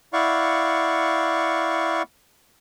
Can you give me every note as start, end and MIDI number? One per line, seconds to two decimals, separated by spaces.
0.13 2.02 64
0.13 2.02 74
0.13 2.02 77
0.13 2.02 78
0.13 2.02 85